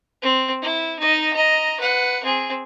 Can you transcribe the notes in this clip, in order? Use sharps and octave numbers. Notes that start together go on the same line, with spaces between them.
C4
E4
D#4 D#5
D#5 A#5
B4 F#5
C4 G#4